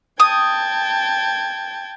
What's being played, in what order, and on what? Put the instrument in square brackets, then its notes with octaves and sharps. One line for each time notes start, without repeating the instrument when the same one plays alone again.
[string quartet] G5 A5 G#6 [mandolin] D#6